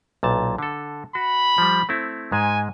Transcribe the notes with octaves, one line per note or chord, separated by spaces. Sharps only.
B1 A#2 A5
D3 A4
F#4 B5
F3 G3
A3 C4 E4
G#2 G#3 G#5